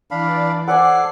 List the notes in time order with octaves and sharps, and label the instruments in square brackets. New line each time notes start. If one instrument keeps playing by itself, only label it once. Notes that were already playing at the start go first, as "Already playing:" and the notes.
[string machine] E3 D5 [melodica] D4 F5 B5
[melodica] A4 D6 [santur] C5 D5 G#5 [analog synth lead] F#5 [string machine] C7